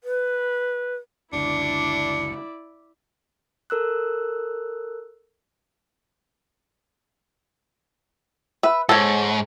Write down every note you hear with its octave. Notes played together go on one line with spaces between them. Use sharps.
B4
F#1 C#2 D3 D4 E4 D5 C#7
A4 A#4 E6 F#6
B4 E5
G#2 A4 C#5